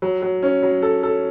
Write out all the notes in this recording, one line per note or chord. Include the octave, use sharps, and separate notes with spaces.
F#3
F#3
C#4
F#3
A4
A4